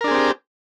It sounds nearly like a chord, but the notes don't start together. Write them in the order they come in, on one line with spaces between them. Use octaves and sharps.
A#4 D4 G#4 C4 G4